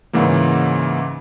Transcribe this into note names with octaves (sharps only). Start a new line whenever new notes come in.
G#2 C#3 E3 A#3